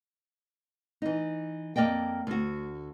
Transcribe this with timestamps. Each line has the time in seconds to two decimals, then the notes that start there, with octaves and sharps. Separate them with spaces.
1.02 E3 D#4
1.76 F2 A#3 D5 D#5 G5
2.27 D2 F#4